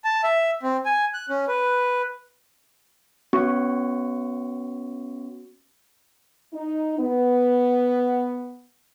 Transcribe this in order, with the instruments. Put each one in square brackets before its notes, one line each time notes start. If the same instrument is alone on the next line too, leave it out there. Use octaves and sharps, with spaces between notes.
[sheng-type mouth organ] A5
E5
C4
G#5
F#6
C#4
B4
[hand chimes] B3 C#4 F#4 C#6
[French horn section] D#4
B3